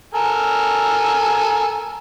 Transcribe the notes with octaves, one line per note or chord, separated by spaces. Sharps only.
A4 A#4 G#5